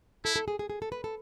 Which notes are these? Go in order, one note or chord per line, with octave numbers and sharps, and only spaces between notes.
E4 A4
A4
G#4
G#4
G#4
A4
B4
A4